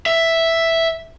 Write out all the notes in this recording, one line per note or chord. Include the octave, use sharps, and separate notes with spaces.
E5